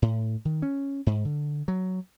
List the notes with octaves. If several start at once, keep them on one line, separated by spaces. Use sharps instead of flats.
A2
D#3
C#4
G#2
D3
F#3